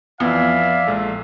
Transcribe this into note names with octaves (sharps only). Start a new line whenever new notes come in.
F2 E3 F3 B3 D5 E5 F5
A#1 G#3 A4